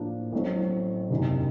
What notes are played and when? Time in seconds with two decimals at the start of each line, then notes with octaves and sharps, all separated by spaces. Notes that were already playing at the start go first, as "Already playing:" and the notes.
Already playing: A2 F3 A#3 D4
0.32 A1 A2 F#3 A3 C4
1.10 F#1 E2 C3 D#3